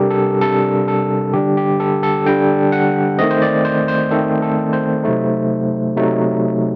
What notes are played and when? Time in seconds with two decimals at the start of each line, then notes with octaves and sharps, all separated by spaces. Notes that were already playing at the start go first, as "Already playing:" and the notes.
Already playing: C3 G3 D4 G4 A4 A#4
0.10 A4
0.41 C3 G3 D4 A4
0.88 A4
1.34 D3 G3 D4 G4
1.57 G4
1.80 A4
2.03 A4
2.26 D3 G3 D4 G5
2.72 F#5
3.18 D#3 A3 C4 D#5
3.31 C5
3.42 D5
3.65 C5
3.88 C5
4.11 D#3 A3 C4 A4
4.42 A4
4.73 C5
5.03 C3 F#3 A3 D#4
5.96 C3 F#3 A3 D#4